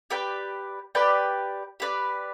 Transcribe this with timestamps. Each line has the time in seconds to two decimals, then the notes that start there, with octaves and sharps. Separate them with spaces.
0.10 G4 B4 D5 G5
0.95 G4 B4 D5 G5
1.80 G4 B4 D5